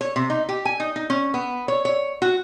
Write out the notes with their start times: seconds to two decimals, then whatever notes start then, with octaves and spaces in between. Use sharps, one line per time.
0.01 C#5
0.16 C3
0.30 D#4
0.49 G4
0.65 G#5
0.80 D#4
0.96 D#4
1.10 C#4
1.34 B3
1.68 C#5
1.85 C#5
2.22 F#4